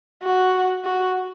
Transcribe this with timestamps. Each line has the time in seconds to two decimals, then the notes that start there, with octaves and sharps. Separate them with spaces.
0.23 F#4
0.85 F#4